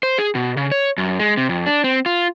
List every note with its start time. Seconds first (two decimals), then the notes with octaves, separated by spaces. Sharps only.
0.03 C5
0.18 G#4
0.35 B2
0.57 C#3
0.71 C#5
0.98 F#2
1.20 G#3
1.37 C3
1.49 F2
1.66 D4
1.84 C4
2.06 F4